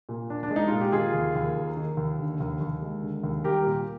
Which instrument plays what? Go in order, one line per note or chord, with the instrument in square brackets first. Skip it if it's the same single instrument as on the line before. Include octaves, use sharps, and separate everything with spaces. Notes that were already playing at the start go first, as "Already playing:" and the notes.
[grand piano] A#2
D4
D4
G#3
D#4
A#2 F4
G4
D#3 F4 G#4
D#2
D#2
A#3
D#3
D#2
D3
D#2
D#2
G#3
D3
D#2
G3 G4 A#4
A#2